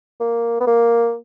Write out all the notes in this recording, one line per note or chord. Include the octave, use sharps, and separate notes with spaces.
A#3
B3
A#3